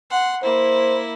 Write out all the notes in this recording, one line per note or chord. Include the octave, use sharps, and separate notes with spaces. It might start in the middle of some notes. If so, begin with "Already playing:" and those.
F#5 C6
A#3 E4 C5